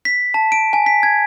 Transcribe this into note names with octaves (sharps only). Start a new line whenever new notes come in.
B6
A5
D7
G#5
B6
G#6